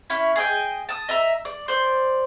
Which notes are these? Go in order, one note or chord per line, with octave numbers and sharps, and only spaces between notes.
C#4 E4
G#4 D#5 G5
A5 D#6
D#5 E5 A#5
D5
C5 D5